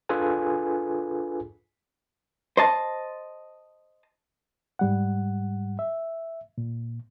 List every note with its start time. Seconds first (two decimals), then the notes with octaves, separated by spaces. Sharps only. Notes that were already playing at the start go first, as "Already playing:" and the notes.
0.09 D4 F4 G#4 A4 B4 G#5
2.57 C5 D#5 A5
4.79 G#2 G3 F#5
5.79 E5
6.58 A#2